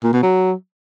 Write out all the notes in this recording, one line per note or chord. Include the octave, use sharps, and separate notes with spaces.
A#2
B2
F#3